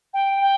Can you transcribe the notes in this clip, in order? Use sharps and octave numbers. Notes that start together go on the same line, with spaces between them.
G5
G5